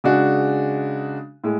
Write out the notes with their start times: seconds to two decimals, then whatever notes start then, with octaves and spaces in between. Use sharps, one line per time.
0.04 C#3 G#3 D4 F#4
1.44 A2 G#3